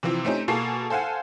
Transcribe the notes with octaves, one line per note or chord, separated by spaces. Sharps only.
C3 E3 F3 C4
A3 C4 C#4 D#4 G4
B2 A#3 G#4 A4 A5 C7
A4 C5 F5 F#5 G#5